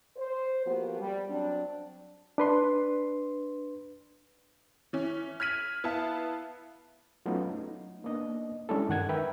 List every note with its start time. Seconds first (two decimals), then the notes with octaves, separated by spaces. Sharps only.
0.17 C5
0.66 F3 A#3 B3 F#4 G4
1.01 G3
1.30 F#3 C4 D4
2.38 D4 B4 C6
4.93 E3 C#4
5.40 F6 G#6 B6 D#7 F#7
5.84 B3 E4 F5 A5
7.26 F#3 A3 B3 C#4 D#4 F4
7.60 D#4
8.04 A#3 B3 D4 D#5
8.69 G3 G#3 C#4 D4 E4 A4
8.89 G2 D#3 F#5 G#6
9.09 A#4 B4 E5 G5